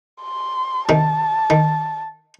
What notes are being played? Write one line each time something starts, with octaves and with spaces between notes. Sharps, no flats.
C6
C3 D#3 A5
D#3